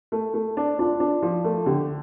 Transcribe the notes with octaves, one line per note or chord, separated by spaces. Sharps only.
A3
A3
D4
D4 F4
D4
F3
A3
D3 G4